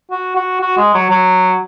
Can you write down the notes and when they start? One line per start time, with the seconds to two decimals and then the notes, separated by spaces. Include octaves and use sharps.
0.11 F#4
0.36 F#4
0.61 F#4
0.78 G#3
0.94 F#3
1.10 F#3